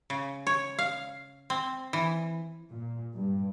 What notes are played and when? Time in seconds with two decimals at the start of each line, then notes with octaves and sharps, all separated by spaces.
0.10 C#3
0.47 C#5
0.79 F5
1.50 C4
1.93 E3
2.72 A#2
3.14 G2